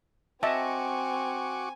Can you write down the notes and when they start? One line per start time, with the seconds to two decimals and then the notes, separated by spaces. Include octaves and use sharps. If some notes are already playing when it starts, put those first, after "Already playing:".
0.43 C4 F#4 D#5 E5 G#5 A5 C#6 D6